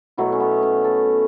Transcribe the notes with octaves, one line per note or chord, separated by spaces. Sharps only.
B2 F#3 A3 E4
C#4
B3
C#4
A4